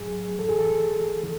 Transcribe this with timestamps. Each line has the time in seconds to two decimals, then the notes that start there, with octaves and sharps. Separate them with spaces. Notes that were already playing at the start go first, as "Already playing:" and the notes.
Already playing: A2 F#3 G#4
0.39 F#2 E3 A4
0.49 G#4
0.59 A4
1.23 E3